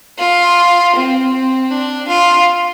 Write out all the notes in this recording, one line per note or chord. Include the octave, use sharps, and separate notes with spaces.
F4
C4
C4
D4
F4